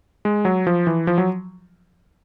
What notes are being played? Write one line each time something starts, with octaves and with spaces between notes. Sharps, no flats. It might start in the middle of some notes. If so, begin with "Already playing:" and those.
G#3
F#3
F3
E3
F3
F#3